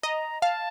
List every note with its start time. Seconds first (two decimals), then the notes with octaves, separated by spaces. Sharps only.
0.03 D#5 A#5
0.41 F5 A5